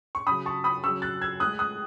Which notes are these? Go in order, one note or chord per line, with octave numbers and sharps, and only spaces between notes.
C#6
C#3 F#3 B5 D#6
A5 C#6
B5 D#6
C#3 F#3 C#6 E6
F#6 A6
E6 G#6
A2 G#3 D#6 F#6
D#6 F#6